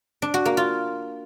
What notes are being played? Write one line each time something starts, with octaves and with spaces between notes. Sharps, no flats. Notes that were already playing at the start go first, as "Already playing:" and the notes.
D4
F#4
A#3
F4